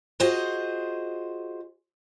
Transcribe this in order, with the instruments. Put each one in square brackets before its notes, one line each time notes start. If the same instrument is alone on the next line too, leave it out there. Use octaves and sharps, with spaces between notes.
[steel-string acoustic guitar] F4 F#4 G#4 C5 D#5